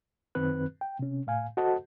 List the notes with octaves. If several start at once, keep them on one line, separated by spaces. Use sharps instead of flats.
F#2 D#3 C4 B4 F#6
G5
C3 C#4
A2 F5 G#5
F#4 A4 C5 D#5 F#5 A5